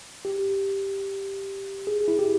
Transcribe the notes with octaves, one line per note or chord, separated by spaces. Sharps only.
G4
G#4
E4
G4